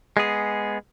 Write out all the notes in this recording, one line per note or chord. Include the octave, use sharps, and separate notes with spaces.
G#3 B3 G#4